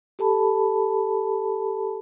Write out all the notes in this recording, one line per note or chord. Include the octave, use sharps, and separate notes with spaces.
G4 A4 A5 B5